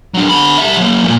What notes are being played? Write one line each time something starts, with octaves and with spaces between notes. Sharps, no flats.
F#3 D4
D3 B5
G3 E5
F#3 A#3
F#2 A#2